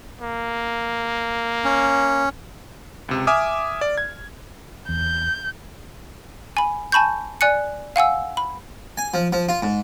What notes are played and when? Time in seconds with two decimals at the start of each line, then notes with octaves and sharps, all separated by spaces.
0.21 A#3
1.64 C#4
3.09 C#2 C3
3.27 E5 G#5 D6 D#6 F6
3.81 D5
3.98 G#6
4.89 E2 G6
6.57 G#5 B5
6.92 G#5 A5 B5 C#6 G6
7.41 D5 G#5 F#6 C#7
7.96 F5 F#5 G#5 E6
8.37 B5
8.97 G#5
9.14 F3
9.33 F3
9.49 F4
9.62 G#2